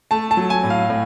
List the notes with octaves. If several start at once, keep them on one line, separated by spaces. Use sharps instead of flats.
A3 A5
A5
F#3
G#5
A2
F5
A2